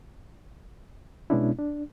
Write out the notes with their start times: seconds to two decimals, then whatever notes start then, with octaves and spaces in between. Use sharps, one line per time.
1.30 B2 G#3 B3 C#4 D4 E4
1.59 D4